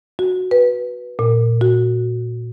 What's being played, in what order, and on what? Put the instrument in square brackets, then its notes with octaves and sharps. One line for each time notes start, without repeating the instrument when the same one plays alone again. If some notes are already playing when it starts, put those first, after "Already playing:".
[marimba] F#4
B4
A#2
F#4